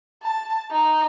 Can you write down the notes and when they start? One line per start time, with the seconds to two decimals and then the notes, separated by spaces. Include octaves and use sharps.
0.23 A5
0.71 D#4